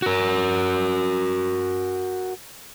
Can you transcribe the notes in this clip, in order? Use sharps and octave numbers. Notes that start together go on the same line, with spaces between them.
F#4 A#4